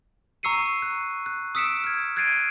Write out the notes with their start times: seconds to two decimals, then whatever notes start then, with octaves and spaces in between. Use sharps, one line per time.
0.43 A#5 C#6 E6 C7 C#7 D#7
0.82 F#6
1.26 F#6
1.55 D#6 E6 B6 C#7 D7 E7
1.84 F6 G#6
2.17 F#6 G#6 A6 C7 D7 D#7